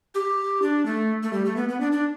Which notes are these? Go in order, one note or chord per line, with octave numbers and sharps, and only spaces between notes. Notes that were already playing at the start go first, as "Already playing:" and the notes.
G4
D4
A3
A3
G3
A3
B3
B3
D4
D4